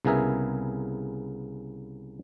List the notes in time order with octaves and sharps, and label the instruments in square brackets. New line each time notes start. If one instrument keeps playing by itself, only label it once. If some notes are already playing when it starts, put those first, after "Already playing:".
[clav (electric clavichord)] C2 C#3 B3 G#4 A#4 E5